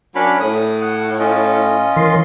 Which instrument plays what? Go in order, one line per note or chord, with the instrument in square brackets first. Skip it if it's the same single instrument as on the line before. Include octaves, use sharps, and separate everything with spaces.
[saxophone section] F#3 A#3 [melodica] C#4 D4 B5
[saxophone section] A2 [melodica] D#6
[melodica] F#5
C#4 F4 D#5
[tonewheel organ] E3 A#4 C6